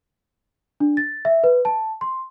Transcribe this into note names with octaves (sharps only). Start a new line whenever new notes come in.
D4
A6
E5
B4
A5
C6